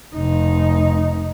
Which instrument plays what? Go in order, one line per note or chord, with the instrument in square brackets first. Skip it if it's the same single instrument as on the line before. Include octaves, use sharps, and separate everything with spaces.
[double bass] F1 D#4